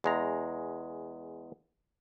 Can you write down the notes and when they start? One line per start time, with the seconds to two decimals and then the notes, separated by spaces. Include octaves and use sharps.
0.04 E2 G#3 A#5